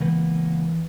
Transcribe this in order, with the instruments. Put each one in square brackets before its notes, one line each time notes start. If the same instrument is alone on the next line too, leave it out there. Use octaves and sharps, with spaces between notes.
[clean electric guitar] C#2 A#3 B3 [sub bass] E3